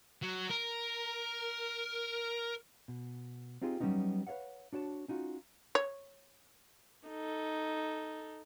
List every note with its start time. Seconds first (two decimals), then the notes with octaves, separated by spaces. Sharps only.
0.22 F#3
0.49 A#4
2.88 B2
3.62 C4 D#4 F4 G4 G#4
3.80 F#3 G3 A#3 B3 C#4 D#4
4.27 B4 C#5 D5 F5 F#5
4.73 D4 F#4 C#5 A5
5.08 C#4 D#4 F4 F#4
5.75 C#5
7.08 D#4 A4